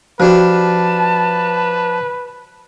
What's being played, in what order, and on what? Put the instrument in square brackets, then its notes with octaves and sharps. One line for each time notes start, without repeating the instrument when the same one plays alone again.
[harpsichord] F3 D4 G4 [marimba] F#4 [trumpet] B4 [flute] A5